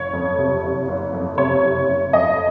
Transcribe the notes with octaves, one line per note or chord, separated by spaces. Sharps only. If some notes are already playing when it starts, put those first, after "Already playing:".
Already playing: F#1 C#5
F2
C3
F#1
F#1
F2
C3 C#5
F#1
F#1
F2 D#5